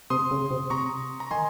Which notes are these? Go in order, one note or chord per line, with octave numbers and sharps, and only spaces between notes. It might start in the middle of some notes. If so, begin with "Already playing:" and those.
C3 C6 D#6
C#3
C3
C3 A#5 C#6
A#5
D#3 G#5 C6